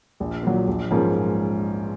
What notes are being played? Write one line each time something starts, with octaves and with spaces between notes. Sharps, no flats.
A#1
A#2 F#3
A#1
G#2 F3 A#3 C#4